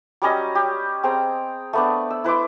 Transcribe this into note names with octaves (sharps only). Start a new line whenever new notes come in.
F#3 G3 C#4 D#5
G4
C4 G#4 G5 A#5
A3 B3 D4
E6
E4 B4 C6 D6